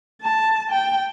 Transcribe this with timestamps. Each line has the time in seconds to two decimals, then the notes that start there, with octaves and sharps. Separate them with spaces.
0.21 A5
0.72 G5